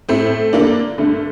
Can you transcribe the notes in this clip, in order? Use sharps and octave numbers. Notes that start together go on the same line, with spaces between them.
A2 A3 C4
G2 D3 A#3 D4
G2 D3 A3